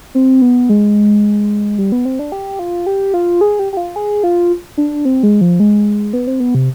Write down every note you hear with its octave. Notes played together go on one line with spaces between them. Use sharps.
C4
B3
G#3
G3
B3
C4
D4
G4
F4
G4
F4
G#4
G4
G4
F4
G#4
F4
D4
C4
G#3
F3
G#3
B3
C4
B3
C3